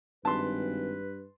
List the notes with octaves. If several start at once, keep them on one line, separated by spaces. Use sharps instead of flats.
G#1 G2 B4 A5 C6